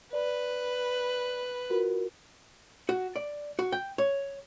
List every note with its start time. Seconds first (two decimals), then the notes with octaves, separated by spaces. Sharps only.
0.13 B4 D5
1.70 F4 F#4 A#4
2.89 F#4
3.16 D5
3.59 F#4
3.72 G5
3.98 C#5